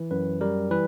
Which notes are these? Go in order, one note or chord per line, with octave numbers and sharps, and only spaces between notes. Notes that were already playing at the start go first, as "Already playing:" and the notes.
Already playing: E3
F#2 B4
G3 A#4
E3 B4